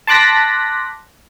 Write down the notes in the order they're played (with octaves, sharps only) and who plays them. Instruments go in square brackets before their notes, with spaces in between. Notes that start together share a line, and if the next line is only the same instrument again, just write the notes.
[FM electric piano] A5 C6 D6 F#6 A#6 B6